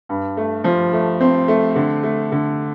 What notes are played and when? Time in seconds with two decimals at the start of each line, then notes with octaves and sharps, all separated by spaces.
0.09 G2
0.37 A3
0.64 F3
0.93 A3
1.20 C4
1.48 A3
1.76 D3
2.03 A3
2.32 D3